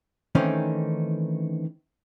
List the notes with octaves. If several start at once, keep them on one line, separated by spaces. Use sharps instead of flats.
D#3 E3 A3 C4 C#4 D#4